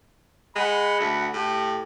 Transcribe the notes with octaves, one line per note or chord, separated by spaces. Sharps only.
G#3 F#5 B5
D2
A2 G4